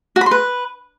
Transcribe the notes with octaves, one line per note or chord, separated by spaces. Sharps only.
F#4
B5
C6
B4